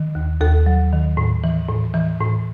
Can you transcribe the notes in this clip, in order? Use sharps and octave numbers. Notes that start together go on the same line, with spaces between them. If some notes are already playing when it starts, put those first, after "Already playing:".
Already playing: D#3
D#2
D#2 A4
F#3
D#3
A2
E3
A2
E3
A2